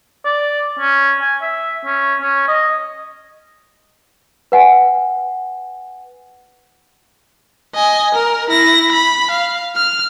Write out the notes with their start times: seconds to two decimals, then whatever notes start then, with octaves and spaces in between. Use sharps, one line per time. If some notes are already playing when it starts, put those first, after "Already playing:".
0.25 D5
0.79 C#4
1.21 G#5
1.42 E5
1.85 C#4
2.22 C#4
2.48 D#5
4.52 B4 F#5 G#5
7.75 D#5 G#5
8.15 A#4
8.50 E4 A#6
8.92 B5
9.31 F5
9.76 F6